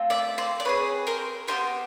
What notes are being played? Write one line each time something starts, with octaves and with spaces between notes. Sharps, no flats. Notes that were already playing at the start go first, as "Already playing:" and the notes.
Already playing: A3 C4 F4
D5 E5
C5 D5
D5
C4 E4 G#4 B4 C#5
A#4 C5
B3 D#4 G4 A#4 C5